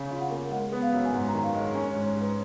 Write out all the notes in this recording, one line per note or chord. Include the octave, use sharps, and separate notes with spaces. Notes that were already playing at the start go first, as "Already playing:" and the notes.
Already playing: C#3 C#4
F4
F#5
A#3
G#3 F#5
B3
F5
F#2
G#5
G#2 F#5
A#5
D#3
F5
G#3
C#5
C#4 C#5
C#5
G#2
C#5
G#2
B4